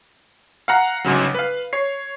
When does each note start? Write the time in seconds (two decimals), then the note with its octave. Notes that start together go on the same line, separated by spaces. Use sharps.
0.68 F5 F#5 A#5
1.05 G1 G#2 C#3 F#3
1.34 B4 F5
1.73 C#5 C7